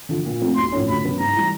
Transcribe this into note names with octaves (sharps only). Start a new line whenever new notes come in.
D3 F3
A#2
F3 A3 C4
B1 C6
A2 F3 A3 C#4
D2 B5
C#3 F#3 B3
G#2 A#5
E3 G3